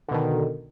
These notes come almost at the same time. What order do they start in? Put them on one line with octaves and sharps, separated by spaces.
D3 B2 D#3